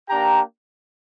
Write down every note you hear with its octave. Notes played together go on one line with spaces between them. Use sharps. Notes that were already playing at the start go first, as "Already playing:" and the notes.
A#3 D4 G4 G5 A#5